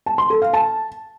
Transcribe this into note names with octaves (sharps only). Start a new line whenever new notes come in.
A5
C6
A4
F5
A5